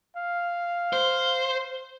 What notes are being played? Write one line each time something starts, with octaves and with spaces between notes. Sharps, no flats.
F5
C5